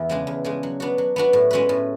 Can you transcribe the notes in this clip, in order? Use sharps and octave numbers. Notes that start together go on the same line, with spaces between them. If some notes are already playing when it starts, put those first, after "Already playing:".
Already playing: E2 E4
C#3 G#3 D4 G#4
E2
C#3 G#3 D4 G#4
F#3
B3 D4 F#4
F#3
B3 D4 F#4
A2
G#3 C#4 F#4 B4
A2